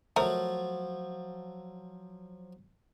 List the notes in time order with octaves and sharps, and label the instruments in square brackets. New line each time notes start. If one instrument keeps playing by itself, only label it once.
[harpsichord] F3 F#3 [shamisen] A3 A#4